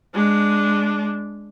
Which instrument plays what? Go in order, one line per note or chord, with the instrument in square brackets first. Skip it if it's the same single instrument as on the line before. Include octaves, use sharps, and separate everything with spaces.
[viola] G#3 D4